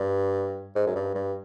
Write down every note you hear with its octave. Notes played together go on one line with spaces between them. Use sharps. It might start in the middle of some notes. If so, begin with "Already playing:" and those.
Already playing: G2
G#2
F#2
G2
G2